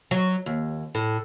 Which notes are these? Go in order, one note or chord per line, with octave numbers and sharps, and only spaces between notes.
F#3
D#2
A2